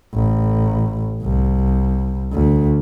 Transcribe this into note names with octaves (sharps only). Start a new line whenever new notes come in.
A1
C2
D2